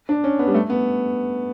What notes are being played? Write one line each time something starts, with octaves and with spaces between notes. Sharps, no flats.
D4
C#4
B3
G3
A3
B3